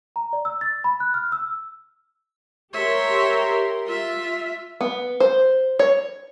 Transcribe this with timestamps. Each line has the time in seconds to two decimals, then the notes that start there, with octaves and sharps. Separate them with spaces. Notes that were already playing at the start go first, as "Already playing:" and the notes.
0.16 A#5
0.33 D5
0.45 E6
0.61 A6
0.84 B5
1.00 F#6
1.14 F6
1.32 E6
2.73 G4 A#4 C#5 E5 C6
3.86 F4 E5
4.81 B3
5.20 C5
5.79 C#5